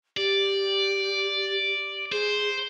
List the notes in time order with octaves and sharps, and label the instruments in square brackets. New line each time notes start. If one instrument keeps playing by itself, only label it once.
[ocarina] G4 [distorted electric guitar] D5
[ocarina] G#4 [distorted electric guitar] C5